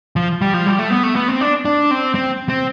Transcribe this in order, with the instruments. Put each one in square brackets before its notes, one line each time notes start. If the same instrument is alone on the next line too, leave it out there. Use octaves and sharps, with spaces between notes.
[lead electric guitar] F3
G3
F3
G3
A3
B3
A3
B3
C4
D4
D4
C4
C4
C4